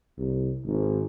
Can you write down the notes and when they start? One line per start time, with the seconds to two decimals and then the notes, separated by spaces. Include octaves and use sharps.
0.18 C2
0.65 G#1